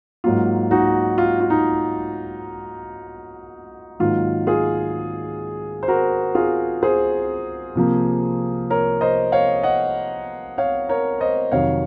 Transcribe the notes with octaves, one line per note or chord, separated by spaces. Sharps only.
G#2 F#3 A#3 F4
D#4 F#4
F4
F4
D#4
G#2 D#3 F#3 A#3 F4
F4 G#4
C5
F#4 A#4
F4 G#4
G#4 C5
C3 F3 A#3
A#4 C#5
C5 D#5
C#5 F5
D#5 F#5
C#5 F5
A#4 C#5
C5 D#5
F2 C3 D#3 F#3 C#5 F5